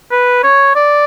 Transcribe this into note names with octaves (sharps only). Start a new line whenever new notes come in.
B4
C#5
D5